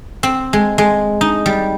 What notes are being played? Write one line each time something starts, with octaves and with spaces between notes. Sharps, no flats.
C4
G#3
G#3
D#4
G3